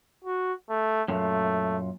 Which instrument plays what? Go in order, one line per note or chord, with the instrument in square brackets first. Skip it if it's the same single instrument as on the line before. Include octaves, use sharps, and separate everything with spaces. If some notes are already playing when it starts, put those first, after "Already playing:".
[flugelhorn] F#4
A3
[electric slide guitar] F#2 A#2 [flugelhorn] A3